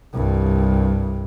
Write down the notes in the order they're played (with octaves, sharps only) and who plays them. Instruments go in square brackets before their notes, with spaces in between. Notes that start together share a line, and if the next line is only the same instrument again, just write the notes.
[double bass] C2 G2